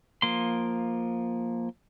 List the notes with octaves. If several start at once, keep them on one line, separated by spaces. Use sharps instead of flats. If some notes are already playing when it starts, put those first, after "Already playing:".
F3 A#3 C6